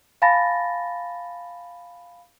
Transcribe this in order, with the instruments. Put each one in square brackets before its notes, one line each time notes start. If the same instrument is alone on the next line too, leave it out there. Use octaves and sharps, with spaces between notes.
[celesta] F5 G#5 A5 B5 A6 A#6